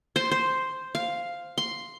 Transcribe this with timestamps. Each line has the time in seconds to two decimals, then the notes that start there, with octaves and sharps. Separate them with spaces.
0.16 C5
0.31 C5
0.95 F5
1.58 C6